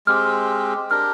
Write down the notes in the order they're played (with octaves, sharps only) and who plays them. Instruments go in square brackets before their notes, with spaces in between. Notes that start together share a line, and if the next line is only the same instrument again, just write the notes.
[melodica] G#3 C4 G4 [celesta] F6
[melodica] D4 G4 A#4 [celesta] F6